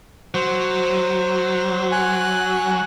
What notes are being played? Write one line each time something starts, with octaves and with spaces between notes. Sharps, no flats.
F#3 C5
G#5 F#6